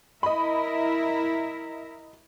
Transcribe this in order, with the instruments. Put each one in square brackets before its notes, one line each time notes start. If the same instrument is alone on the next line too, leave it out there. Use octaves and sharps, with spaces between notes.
[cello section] E4 A#4 E5 [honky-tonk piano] D#5 B5